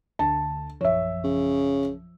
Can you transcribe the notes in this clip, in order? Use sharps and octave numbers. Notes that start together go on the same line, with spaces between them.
D2 D3 A5
A#1 F#2 F3 C#5 E5
C#3